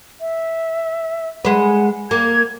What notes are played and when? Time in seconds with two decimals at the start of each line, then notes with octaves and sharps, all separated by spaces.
0.21 E5
1.45 G#3 B4 F#5
2.11 A#3 G#6